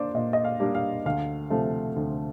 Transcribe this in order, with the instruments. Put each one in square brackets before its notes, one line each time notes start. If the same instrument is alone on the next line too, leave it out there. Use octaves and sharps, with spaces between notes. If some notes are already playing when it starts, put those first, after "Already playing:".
Already playing: [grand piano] A#3 D4 C5 D5
A#2 D#5
D#5
F5
G3 A#3 D4
F5
D2 F5
C3 F3 A3
D2